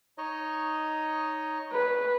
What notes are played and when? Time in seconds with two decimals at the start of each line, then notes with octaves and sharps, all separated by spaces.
0.18 D#4 C#5 D#5
1.72 B4